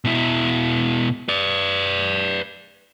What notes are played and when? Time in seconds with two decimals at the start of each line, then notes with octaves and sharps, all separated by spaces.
0.05 B2 E4
1.29 B4 D5